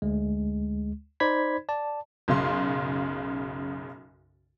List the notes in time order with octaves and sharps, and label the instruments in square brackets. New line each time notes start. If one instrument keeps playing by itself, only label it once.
[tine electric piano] D2 G#3
D#4 C5 D5 B5 G#6 B6
D5 A5
[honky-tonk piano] B1 F#2 C#3 F5 C6